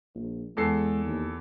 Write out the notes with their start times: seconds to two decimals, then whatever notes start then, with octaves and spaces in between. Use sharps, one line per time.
0.15 A#1
0.57 E2 G#3 A4 C7
1.06 D#2